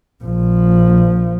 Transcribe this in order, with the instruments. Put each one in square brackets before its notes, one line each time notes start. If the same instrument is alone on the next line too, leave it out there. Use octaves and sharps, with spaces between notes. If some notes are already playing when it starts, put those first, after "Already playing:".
[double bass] A#1 F3